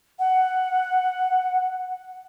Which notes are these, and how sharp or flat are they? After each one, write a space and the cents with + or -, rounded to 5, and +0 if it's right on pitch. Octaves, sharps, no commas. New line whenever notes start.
F#5 +5